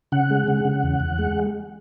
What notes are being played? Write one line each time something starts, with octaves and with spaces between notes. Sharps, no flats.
C#3 F#5
G#3
C#3
C#3
E2
E2
G#3